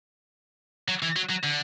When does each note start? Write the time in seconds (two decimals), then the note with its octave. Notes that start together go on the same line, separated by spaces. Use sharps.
0.88 F#3
1.03 E3
1.17 F#3
1.30 F#3
1.44 D3